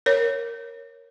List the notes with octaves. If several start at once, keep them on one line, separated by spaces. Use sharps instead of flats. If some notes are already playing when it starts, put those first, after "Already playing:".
A#4 C#5